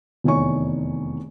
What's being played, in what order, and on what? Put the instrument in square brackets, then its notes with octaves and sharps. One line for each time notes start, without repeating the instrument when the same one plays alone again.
[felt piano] F1 E2 D#3 C#5 G#5 C#6